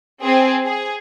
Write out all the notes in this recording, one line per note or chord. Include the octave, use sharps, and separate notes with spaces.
C4 G#4
G#4